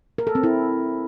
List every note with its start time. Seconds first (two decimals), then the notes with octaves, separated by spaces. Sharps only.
0.18 A#4
0.27 A4
0.35 C4
0.43 E4